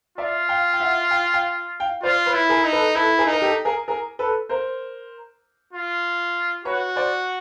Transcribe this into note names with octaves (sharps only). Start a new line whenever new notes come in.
F4 D5 E5
F5 G5
G5
E5 F#5
F5 G5
F5 G5
F5 G5
F4 C5 D5
B4 C#5
E4
G#4 A#4
D#4
A4 B4
E4 A4 B4
G#4 A#4
D#4
A#4
G4 A4
G#4 A#4
G#4 A#4
A4 B4
A#4 C5
F4
F#4 B4 C#5
C5 D5